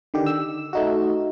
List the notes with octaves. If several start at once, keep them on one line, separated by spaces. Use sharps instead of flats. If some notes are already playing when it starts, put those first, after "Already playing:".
D3 D#3 G4
E6
A3 D#4 F#4